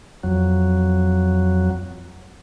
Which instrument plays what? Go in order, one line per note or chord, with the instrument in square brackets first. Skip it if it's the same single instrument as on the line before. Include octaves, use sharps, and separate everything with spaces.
[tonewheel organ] F2 F#3